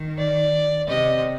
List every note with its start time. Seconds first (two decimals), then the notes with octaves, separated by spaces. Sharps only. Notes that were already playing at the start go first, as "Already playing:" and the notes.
Already playing: D#3
0.18 D5
0.88 C3 D#5